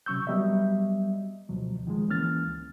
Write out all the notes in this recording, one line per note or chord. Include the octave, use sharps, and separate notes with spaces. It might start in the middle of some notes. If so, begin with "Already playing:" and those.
C3 F#3 C#4 C#6 E6 G6
F#3 G3 B3 D#5 E5
D2 B2 F3 F#3
D#3 F3 G#3
D2 E3 A#3 C#4 F6 A6
C#2